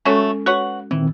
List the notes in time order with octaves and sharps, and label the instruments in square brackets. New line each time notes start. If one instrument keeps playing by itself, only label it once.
[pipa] F#3 A3 C#5 [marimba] G#3 C#4 A4
[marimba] F#4 [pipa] B4 C#5 F#5
[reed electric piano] A#2 D#3 C4 [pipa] E3